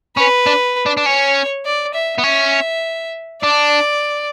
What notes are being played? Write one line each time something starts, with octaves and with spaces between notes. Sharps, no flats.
C#4 B4
D4
D4
D4
C#4 C#5
D5
E5
B3
C#4 E5
D4 D5